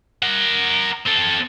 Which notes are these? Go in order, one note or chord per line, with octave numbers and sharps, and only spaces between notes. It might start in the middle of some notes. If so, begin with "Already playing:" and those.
A#4 F#5
C4 A4